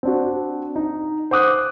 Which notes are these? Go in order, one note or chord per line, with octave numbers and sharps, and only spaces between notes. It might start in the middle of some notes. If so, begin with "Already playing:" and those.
C4 D4 F#4
D#4
C5 F#5 D6 D#6 F#6